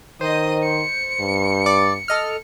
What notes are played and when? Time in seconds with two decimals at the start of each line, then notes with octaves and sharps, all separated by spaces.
0.21 D#3 C5 D#5 D#6
0.63 C#7
1.20 G2
1.66 D5
2.08 A4 D#5 F6